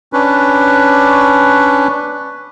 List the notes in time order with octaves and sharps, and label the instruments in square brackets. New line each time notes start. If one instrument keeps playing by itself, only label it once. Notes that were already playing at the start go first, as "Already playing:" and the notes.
[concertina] C#4 D4 B4